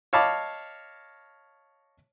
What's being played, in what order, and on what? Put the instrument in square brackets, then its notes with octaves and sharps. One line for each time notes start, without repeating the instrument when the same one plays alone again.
[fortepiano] C#5 D#5 F5 A5 B5 D6